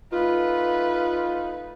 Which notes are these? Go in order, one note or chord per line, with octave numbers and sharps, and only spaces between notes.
A3 D#4 F4 B4